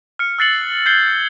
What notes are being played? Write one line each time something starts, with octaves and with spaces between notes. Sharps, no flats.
F6 C#7
E6 F#6 A6 C7 C#7 F#7
G6 G#6 C7 G7